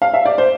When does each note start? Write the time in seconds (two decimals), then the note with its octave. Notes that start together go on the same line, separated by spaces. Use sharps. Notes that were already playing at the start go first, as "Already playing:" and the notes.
0.02 F5
0.14 E5
0.25 D5
0.38 C5